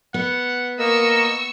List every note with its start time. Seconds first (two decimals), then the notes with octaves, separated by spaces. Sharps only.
0.14 B3 F#5
0.79 A#3 A#4 D#5 C#6 E6